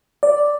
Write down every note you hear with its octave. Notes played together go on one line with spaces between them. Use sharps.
D5